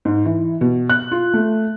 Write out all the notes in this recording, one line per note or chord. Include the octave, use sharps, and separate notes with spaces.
G#2
E3
B2
F#6
F4
A3